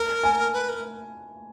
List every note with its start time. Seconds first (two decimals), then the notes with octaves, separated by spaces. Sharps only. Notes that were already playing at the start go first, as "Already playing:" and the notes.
Already playing: A#4 A5
0.24 G#5
0.53 B4
0.69 A#4